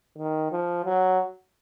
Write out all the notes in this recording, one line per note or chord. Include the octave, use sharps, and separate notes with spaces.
D#3
F3
F#3